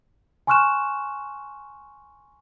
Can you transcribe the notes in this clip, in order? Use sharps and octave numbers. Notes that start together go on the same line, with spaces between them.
G#5 C6 C#6 F6 F#6 E7